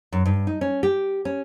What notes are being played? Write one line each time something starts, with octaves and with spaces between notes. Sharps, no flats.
F#2
G2
D#4
C#4
G4
C#4